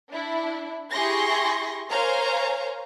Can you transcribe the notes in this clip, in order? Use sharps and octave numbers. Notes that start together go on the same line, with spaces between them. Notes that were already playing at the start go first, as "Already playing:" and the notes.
D4 E4
E4 G4 G#4 C6 C#6 A#6
A#4 C5 C#5 F5 G#5 A#5